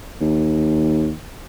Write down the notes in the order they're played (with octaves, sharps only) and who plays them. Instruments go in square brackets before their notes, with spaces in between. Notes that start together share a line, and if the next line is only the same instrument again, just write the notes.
[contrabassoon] D#2